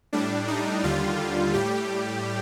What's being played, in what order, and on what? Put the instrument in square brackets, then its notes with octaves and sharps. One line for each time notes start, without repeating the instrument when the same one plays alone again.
[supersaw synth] A2 G3 D4
D#4
D#2 D3 G3 F4
A2 G3 G4